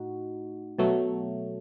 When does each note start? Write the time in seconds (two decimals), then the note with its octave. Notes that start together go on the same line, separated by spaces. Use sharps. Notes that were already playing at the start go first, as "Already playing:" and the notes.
Already playing: A2 D#4 F#4
0.79 B2 F#3 A3